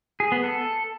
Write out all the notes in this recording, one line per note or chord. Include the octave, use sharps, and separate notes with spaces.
G#4
B3
A4